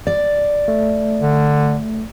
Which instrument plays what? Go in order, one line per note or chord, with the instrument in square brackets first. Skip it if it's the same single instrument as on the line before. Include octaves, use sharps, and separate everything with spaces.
[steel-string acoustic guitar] D5
[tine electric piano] A3
[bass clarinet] D3